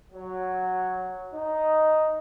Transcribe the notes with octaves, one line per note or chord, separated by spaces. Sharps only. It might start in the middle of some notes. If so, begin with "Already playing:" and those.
F#3
D#4